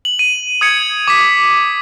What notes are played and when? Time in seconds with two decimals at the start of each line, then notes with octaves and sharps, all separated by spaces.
0.05 F#7
0.19 D#7
0.61 D#6 G#6 C#7
1.08 D6 B6